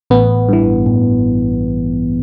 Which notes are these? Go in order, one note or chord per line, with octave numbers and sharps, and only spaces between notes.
A1 B3
G2 E3
A1